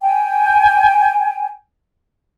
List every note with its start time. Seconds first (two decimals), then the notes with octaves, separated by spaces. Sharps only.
0.01 G5 G#5